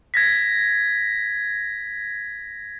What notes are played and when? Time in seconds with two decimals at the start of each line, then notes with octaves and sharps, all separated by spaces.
0.14 G#6 A#6 B6